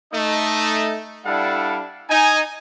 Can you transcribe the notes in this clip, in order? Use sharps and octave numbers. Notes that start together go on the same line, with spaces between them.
A3 D#4 D#5
G3 D4 E4 A4 F5 F#5
D#4 G#5